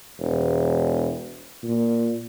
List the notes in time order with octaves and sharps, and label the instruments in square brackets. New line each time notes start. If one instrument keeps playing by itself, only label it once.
[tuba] E1
A#2